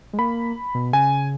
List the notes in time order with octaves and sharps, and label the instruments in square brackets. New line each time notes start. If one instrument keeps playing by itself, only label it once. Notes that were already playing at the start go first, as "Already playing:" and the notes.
[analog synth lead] G#3
[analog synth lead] A#3 [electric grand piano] B5
[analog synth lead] B2
[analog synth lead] C#3 [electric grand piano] G#5